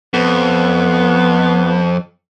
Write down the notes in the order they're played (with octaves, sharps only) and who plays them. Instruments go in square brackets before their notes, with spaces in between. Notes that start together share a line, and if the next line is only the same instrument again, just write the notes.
[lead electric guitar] F2 [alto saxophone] B3